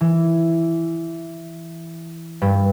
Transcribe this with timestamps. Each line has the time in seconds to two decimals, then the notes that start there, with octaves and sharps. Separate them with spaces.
0.01 E3
2.42 G2